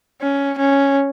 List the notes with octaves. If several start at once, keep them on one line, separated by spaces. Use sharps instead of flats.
C#4
C#4